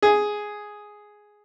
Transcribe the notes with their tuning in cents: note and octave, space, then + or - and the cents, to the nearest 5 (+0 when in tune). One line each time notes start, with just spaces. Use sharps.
G#4 +0